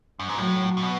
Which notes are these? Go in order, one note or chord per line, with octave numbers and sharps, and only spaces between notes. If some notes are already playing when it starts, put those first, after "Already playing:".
F#2
G#2
A2 F#3
A2
B2